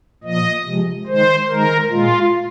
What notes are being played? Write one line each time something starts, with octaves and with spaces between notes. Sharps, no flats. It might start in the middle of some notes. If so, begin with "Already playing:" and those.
A#2 F3 A#3 D#5
C3 F3 G#3
D#3 G#3 C5
D#3 G#3 A#4
A#2 G#3 F4